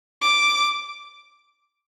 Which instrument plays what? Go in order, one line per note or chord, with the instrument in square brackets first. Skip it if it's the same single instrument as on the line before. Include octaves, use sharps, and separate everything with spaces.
[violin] D6